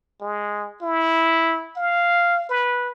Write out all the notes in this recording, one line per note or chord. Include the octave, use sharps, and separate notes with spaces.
G#3
E4
F5
B4